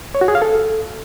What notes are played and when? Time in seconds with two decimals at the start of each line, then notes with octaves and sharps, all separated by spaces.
0.15 C#5
0.21 F#4
0.28 G#4
0.35 F5
0.42 A4